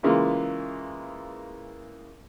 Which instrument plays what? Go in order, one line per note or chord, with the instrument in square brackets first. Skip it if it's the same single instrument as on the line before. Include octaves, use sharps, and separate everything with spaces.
[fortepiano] C#3 E3 G#3 A#3 F4